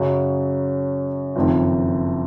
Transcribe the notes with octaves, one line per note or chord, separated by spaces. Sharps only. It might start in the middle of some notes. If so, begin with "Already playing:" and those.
Already playing: F#2 C#3 F#3
F#1 F2 D#3